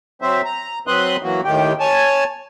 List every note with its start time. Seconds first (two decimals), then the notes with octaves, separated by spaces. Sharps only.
0.22 F#3 C4 C5 E5
0.45 A#5
0.87 F#3 C4 B4 C6 D#6 F#6
1.23 E3 F#3 A#3 F#4
1.45 D#2 A2 D#3 G4 G5
1.80 C#5 G#5 A5